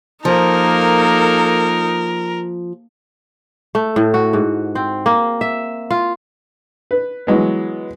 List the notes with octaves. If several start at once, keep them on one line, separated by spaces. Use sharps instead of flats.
F3 A#3 D#4 A4 A#4
A3
A2
F#4
G#2
C4
A#3
E5
F4
B4
E3 F#3 G#3 B3